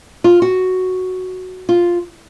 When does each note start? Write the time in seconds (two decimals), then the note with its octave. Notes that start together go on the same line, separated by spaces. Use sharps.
0.24 F4
0.42 F#4
1.69 F4